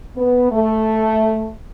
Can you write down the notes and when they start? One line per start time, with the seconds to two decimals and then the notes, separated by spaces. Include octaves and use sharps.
0.16 B3
0.52 A3